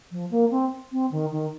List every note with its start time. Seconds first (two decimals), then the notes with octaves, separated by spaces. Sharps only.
0.11 F3
0.31 A#3
0.51 C4
0.92 C4
1.11 D#3
1.32 D#3